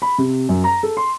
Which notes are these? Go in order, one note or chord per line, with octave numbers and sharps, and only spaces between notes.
B5
C3
F#2
A#5
A4
C6